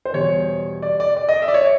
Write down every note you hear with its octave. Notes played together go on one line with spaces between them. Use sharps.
C5
E2 B2 G3 C#5
D5
D5
D5
D#5
E5
D5
C#5